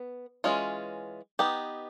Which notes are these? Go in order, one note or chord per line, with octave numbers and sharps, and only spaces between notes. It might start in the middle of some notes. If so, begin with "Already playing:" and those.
Already playing: B3
E3 G#3 C#4 F4
B3 D#4 G4